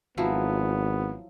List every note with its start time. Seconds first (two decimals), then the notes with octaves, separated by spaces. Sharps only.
0.17 G#1 F3 F#3 B3 E4